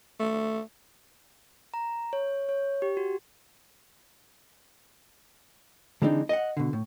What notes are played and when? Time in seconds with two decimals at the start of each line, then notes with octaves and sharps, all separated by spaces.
0.20 A3
1.74 A#5
2.13 C#5
2.49 C#5
2.82 G4
2.97 F#4
6.02 D3 E3 G#3 C4 D4 D#4
6.29 D#5 F5 F#5
6.57 B2 D3
6.73 A2